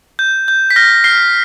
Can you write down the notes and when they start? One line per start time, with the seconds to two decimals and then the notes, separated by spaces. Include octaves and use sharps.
0.19 G6
0.48 G6
0.70 B6
0.76 F6 A#6
1.04 F6 C7